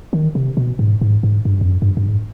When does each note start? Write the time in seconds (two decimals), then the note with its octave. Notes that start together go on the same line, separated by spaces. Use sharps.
0.13 D#3
0.35 C3
0.57 B2
0.79 G#2
1.01 G#2
1.23 G#2
1.45 G2
1.61 F2
1.67 F#2
1.82 G2
1.97 G2
2.07 G#2